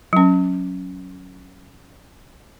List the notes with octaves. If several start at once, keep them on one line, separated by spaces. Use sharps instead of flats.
F#3 C#4